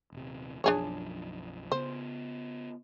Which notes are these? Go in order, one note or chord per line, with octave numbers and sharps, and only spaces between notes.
D#1 C3
B1 F#2 F3 D4 G#4 C#5
C#3 B3 C5